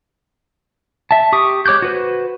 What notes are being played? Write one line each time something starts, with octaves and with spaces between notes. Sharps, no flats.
E5 A5
G4 C#6 D#6
G#3 C#5 D6 F#6 G6
F#4 B4 C5